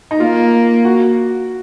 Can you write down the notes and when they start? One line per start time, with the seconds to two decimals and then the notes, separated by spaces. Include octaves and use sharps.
0.11 D#4
0.20 A#3 F4
0.85 F#4